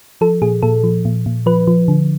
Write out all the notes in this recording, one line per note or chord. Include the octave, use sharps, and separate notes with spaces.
F3 A4
A#2 G#4
A#2 A4
F3
A#2
A#2
F3 B4
F3
D3